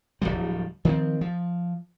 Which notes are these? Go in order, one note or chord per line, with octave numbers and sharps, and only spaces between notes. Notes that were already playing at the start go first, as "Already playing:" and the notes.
D1 G#1 F3 G3
D#3 F3 G#3 C4
F3